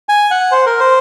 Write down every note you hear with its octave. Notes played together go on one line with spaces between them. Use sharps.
G#5
F#5
C5
A#4
C5